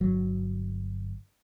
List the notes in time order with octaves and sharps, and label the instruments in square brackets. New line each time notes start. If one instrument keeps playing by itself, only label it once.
[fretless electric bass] G1 F#3